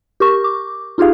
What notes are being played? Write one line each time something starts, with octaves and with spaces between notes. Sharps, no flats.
G4 A#4 C#6
D6
D#4 F4 G4 G#4 F5